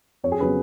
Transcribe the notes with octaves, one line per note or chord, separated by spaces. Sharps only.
F2 C#5
G#4
C#3 F#3 B3 B4